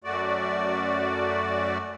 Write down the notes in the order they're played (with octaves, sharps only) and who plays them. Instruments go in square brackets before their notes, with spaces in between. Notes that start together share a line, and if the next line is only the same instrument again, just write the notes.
[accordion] F#2 A3 F#4 D5